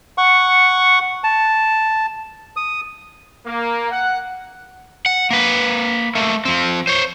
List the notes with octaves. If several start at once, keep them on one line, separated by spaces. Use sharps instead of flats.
F#5 C#6
A5
D#6
A#3
F#5
F#5
A#3 B4
A3 A#3
F3 C4
C5 C#5